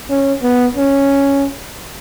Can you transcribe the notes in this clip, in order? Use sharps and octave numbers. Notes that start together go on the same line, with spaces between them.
C#4
B3
C#4